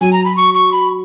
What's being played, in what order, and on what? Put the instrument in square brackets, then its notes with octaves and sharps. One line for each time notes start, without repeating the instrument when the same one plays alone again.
[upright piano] F#3 [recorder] G#5
[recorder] A#5
B5
C#6
C#6
B5